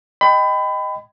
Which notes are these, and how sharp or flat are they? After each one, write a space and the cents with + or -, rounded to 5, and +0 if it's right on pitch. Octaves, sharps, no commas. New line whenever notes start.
D#5 +0 G5 +0 B5 +30